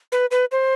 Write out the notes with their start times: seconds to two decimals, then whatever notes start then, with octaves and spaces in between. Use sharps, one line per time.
0.12 B4
0.31 B4
0.52 C5